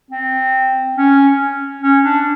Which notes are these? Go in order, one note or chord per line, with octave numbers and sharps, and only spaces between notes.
C4
C#4
C#4
D4